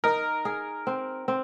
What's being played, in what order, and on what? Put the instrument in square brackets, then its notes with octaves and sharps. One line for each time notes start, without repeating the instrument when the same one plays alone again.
[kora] D#4 [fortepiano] A#4
[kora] G#4
C4
C4